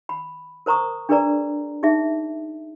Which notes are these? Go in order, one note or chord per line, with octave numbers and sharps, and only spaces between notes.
B5
A#4 C5 A#5 C#6 D#6
D4 G#4 A#4 B4 D5 A#5
D#4 G#4 E5